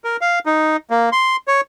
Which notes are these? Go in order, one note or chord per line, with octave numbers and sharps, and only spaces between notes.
A#4
F5
D#4
A#3
C6
C#5